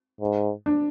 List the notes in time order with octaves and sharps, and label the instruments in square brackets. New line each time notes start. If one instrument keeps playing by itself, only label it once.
[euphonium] G#2
[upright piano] D4